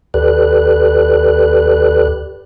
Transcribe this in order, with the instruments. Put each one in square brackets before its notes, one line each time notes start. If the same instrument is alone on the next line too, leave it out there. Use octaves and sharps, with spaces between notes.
[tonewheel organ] D#2 G4 A4 B4 D5 F#6